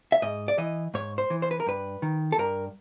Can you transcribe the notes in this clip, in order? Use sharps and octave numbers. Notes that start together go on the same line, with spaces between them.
E5
G#2 D#5
D5
E3 D#5
G#2 C#5
C5
E3
C5
B4
A#4
G2 B4
D#3
A4
G2 A#4